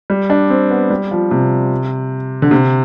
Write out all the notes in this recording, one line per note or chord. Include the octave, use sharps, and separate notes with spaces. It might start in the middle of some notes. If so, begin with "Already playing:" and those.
G3
D4
C4
B3
G3
F3
C3
D3
C3